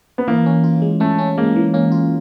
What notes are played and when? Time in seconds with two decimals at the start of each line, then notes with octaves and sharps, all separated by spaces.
0.18 B3
0.28 E3 A#3
0.46 C#4
0.64 F4
0.82 G#3
1.00 A3 C#4
1.18 C#4
1.38 G#3 A#3
1.56 E3
1.73 A#3 C#4
1.92 F4